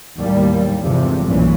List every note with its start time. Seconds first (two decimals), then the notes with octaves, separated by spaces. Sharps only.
0.17 D#2 A2 G3 A#3
0.81 G1 E2 C3 F3 G#3
1.24 B1 G2 A#2 E3 C#4